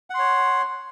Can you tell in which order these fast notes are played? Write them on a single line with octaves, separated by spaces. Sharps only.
F#5 C6 C#5